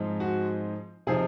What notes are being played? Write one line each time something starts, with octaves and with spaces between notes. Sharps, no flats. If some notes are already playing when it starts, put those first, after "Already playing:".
Already playing: G#2 F3 G#3 C4 D#4
F#4
C3 F3 C4 D#4 G#4